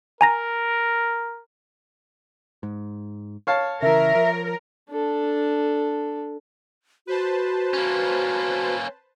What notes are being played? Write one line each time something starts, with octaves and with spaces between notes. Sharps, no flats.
A#4 G#5 A#5 A#6
G#2
C#5 F5 A5
C#3 E3 A#4 E5
F3
D4 A4
F#4 B4 C5 A5
A#3 C#4